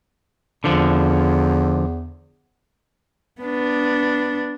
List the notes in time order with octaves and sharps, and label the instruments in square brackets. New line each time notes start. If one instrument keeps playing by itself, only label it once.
[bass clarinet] E2 [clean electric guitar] D3 F3
[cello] B3 D4